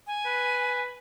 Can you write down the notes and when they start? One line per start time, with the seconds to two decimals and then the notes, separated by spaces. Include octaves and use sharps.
0.07 G#5
0.26 B4